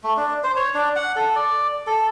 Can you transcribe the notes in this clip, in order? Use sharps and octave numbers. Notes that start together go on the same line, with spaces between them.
A3
D4
C5
C#5
D4
F#5
A4
D5
A4